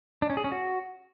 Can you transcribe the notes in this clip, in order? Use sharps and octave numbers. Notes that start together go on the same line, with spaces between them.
D4
C#4
G#4
C#4
F#4